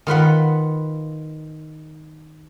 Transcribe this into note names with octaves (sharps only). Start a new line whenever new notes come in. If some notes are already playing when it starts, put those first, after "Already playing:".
D#3 F4 B4 F#5